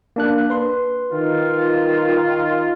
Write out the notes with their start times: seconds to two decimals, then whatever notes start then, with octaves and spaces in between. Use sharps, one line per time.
0.16 A#3 D4 F#6
0.50 B4 C6
1.13 D#3 F4